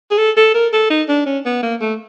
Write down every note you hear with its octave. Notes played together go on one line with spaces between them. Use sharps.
G#4
A4
A4
A#4
A4
D#4
D4
C#4
B3
A#3
A3